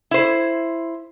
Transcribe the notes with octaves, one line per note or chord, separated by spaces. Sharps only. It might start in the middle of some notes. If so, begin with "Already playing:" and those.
E4 C5